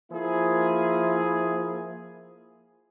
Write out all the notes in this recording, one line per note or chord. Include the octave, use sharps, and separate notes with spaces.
F3 A#3 E4 G#4